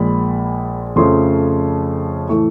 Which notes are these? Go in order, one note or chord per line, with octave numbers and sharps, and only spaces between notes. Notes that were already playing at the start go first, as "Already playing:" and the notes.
Already playing: A#1 A#2 F3 G#3 B5
F2 C#3 F3 A3 C#4 C6
A2 E3 A3 C#6